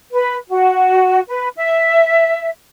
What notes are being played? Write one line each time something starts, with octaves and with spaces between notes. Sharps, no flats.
B4
F#4
B4
E5